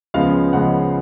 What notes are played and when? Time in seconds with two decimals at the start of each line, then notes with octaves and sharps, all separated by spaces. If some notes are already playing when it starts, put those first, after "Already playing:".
0.14 C#2 C#3 F3 G#3 B3 F5
0.53 C#2 C#3 F3 G#3 B3 F#5